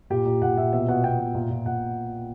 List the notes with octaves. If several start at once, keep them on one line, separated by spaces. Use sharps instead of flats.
A#2 G4
A#2
A#2 F#5
A#2 E5
B2 E5
B2 F#5
B2 G5
B2
A#2
A#2
A#2 F#5